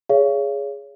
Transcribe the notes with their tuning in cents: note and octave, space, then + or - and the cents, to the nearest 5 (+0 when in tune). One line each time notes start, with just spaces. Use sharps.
G#4 +0 C#5 +25 F5 -40